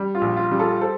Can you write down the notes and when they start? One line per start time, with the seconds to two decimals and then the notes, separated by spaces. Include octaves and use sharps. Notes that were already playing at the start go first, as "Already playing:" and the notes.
Already playing: G3
0.15 F4
0.21 A#1
0.37 F4
0.51 G3
0.59 F4 A4
0.81 A4 C5